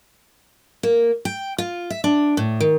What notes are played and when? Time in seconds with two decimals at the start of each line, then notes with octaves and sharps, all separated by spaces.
0.83 A#3
1.25 G5
1.58 F4
1.90 E5
2.04 D4
2.37 A2
2.60 D#3